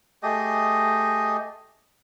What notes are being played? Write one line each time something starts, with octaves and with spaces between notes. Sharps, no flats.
A3 G4 G#4 D#5